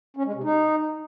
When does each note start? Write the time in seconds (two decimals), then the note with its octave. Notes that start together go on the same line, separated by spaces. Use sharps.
0.17 C#4
0.26 G#3
0.35 C3
0.44 D#4